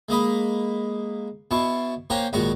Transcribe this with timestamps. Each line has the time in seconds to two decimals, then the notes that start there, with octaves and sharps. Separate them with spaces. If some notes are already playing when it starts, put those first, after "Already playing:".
0.09 G#3 A#3 D#5 B5
1.51 B2 E4 A5 C#6
2.10 A#3 C#4 G4 C5 F#5 A#5
2.33 A#1 D#2 G#2 F#4 A#5 C#6